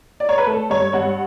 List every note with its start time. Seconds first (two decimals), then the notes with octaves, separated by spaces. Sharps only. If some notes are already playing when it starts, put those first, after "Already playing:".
0.20 D5
0.29 C#5
0.38 B4
0.47 A3 A4
0.70 G2 C#5
0.93 G2 F#5